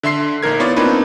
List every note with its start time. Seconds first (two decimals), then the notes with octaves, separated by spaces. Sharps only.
0.03 D3 E5 C6 C7
0.43 A#1 D#4 A#4 G#6
0.60 B3 E4 F4 C#5 D5
0.76 A#3 C4 D4 D#4 B4